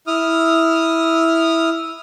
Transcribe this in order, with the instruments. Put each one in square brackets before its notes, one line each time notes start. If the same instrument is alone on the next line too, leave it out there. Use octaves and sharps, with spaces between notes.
[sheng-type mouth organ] E4 D#6 F6